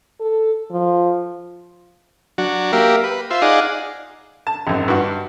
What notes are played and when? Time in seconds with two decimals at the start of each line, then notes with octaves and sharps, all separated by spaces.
0.21 A4
0.71 F3
2.38 F#3 D4 F#4
2.73 A#3 G4 A#4 E5 F5
3.04 B4
3.31 F4 C5 E5
3.42 D#4 G#4 D5 F5 F#5
4.47 A5
4.67 G#1 F#2
4.88 G2 F#4